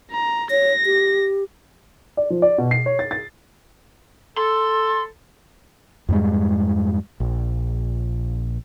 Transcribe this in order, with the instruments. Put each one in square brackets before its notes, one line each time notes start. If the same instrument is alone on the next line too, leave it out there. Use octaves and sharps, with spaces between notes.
[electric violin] A#5
[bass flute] C#5 [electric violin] A#6
[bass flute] G4
[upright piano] D5
F3
D5
B2
C7
C#5
A6
A6
[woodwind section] A4 [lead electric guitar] C6
[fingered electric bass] F2 G#2 G3 G#3
A#1